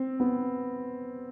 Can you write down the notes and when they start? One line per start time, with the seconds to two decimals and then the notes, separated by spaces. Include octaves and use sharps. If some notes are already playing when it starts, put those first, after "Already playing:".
Already playing: C4
0.20 B3